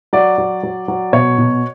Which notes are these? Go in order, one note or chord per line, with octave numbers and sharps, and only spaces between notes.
F#3 D5
F#3
F#3
F#3
B2 C#5
B2